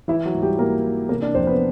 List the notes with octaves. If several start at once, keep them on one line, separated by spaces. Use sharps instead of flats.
E3 E4
F#3 F#4
G#2
G3 G4
G#2 A#3 A#4
E3
C3 A#3 A#4
D4 D5
F2 C4 C5
B3 B4